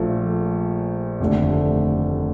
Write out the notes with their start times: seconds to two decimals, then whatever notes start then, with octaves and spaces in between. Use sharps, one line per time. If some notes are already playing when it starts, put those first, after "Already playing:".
Already playing: A#1 A#2 F3 A3
1.20 F1 D#2 D3 A3 D4